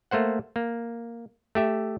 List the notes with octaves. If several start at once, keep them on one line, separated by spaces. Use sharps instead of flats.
A3 A#3 C5 F#5
A#3
A3 G4 E5